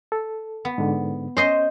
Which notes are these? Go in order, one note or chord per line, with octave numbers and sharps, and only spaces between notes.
A4
B3
G#2 D3
C#4 C5 D#5 C6 G6